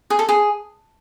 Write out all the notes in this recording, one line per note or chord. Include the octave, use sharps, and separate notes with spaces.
G#4
A4
G#4